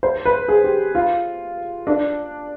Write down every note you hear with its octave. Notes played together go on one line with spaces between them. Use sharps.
C5
B4
G#4
G4
F4
D4